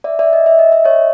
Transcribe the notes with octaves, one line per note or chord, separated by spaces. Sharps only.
D5 E5
D5 E5
D#5
E5
D#5
E5
C#5 D#5